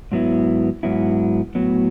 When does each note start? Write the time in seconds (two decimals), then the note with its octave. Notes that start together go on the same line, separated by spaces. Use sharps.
0.12 G#2 F#3 B3 E4
0.83 G#2 F#3 B3 E4
1.55 A2 F#3 B3